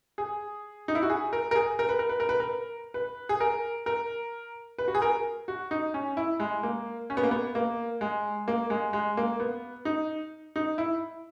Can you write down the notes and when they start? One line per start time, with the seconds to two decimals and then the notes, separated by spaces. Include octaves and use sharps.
0.18 G#4
0.88 D#4
0.95 E4
1.02 F#4
1.10 G#4
1.33 A#4
1.51 A#4
1.55 G#4
1.79 A#4
1.89 B4
1.99 A#4
2.09 B4
2.20 A#4
2.29 B4
2.40 A#4
2.94 B4
3.29 G#4
3.40 A#4
3.86 A#4
4.78 B4
4.88 F#4
4.95 G#4
5.02 A#4
5.48 F#4
5.71 D#4
5.94 C#4
6.17 E4
6.40 G#3
6.63 A#3
7.10 C#4
7.17 B3
7.23 A#3
7.31 B3
7.55 A#3
8.01 G#3
8.48 A#3
8.70 G#3
8.93 G#3
9.17 A#3
9.40 B3
9.85 D#4
10.56 D#4
10.78 E4